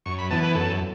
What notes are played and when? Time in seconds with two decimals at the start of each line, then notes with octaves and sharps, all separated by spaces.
0.06 F#2 C#6
0.19 B5
0.30 E3 B3 A5
0.43 B4
0.55 F#2 A4